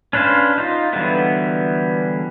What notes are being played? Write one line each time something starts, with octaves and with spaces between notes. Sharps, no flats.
C#4 D4 B4 C5 F5
D#4 F4
D3 E3 F#3 G3 B3